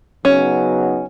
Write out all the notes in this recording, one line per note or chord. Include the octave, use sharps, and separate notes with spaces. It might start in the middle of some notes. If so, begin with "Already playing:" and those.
C#3 F#3 B3 C#4 D#4